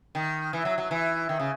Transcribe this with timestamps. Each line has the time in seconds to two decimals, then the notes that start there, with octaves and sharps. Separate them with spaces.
0.15 D#3
0.53 E3
0.65 F#3
0.78 F#3
0.91 E3
1.29 D#3
1.40 C#3